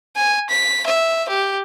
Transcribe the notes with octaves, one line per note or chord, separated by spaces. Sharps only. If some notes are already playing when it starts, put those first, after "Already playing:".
G#5
B6
E5
G4